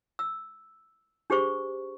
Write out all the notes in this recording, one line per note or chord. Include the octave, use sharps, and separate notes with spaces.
E6
D4 G4 G#4 C5 C#6